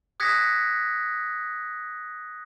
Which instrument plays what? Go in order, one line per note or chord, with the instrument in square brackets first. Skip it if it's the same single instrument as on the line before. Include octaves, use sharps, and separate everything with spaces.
[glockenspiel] D#6 F#6 G#6 A#6 B6 C#7